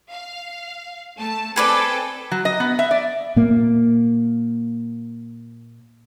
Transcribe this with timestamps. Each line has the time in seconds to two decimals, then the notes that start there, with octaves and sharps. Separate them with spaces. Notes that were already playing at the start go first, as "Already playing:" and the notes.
0.11 F5
1.17 A3 A5
1.56 C4 G#4 A4 B4 D5 G5
2.31 F#3
2.45 D#5
2.60 B3
2.79 E5
2.91 D5
3.36 A#2 A#3